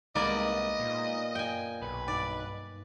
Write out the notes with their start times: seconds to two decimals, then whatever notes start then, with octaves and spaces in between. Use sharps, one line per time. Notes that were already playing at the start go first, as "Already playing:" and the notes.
0.15 C2 G#3 A#3 B3 D#4 D5 D#5
0.80 A#2
1.35 F#2 G5 G#5
1.82 B1 B4
2.08 G2 D#4 D5